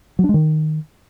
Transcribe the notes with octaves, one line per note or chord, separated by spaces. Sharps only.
F#3
D4
G#3
D#3